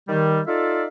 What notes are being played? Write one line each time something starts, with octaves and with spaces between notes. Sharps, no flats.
D#3 G3
D#4 F4 A4 D5 E5 F5